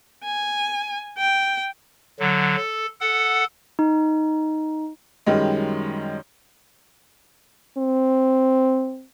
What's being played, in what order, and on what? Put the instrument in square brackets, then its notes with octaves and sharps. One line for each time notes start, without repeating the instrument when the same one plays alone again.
[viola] G#5
G5
[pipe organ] D3 F#3
A4
A4 F#5
[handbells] D#4
[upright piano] F#2 D#3 G3 G#3
[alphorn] C4